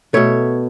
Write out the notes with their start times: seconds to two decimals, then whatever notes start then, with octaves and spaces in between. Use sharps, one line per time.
0.13 B2 A3 C#5 E5